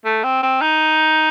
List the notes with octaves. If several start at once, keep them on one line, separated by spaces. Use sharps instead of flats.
A3
C4
C4
D#4